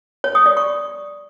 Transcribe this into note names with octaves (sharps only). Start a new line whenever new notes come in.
C#5
D#6
D5
C#6